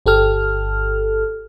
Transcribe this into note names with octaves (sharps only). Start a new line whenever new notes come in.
G1 G4 A4 F6